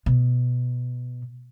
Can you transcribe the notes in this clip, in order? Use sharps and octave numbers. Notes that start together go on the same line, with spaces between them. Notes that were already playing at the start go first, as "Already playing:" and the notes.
B2